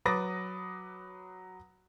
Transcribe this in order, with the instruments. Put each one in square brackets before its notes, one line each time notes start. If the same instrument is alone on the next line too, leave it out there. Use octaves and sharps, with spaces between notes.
[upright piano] F#3 B4 D6 D#6 A6 A#6